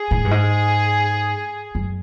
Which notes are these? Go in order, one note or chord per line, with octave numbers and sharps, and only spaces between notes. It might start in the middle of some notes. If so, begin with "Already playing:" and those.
Already playing: G#4
A2
G2
G#2
F#2